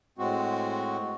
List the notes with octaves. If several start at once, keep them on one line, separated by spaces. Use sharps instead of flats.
A2 G#3 C4 F#4